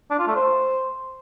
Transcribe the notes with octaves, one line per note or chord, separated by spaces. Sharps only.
D4
F4
A3
C5